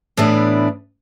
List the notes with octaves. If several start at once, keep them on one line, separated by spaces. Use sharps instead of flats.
A2 E3 B3 D4